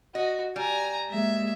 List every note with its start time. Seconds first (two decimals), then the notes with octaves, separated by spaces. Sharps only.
0.15 F#4 D#5
0.56 G3 G#5 A#5
1.10 G#3 A#3 E5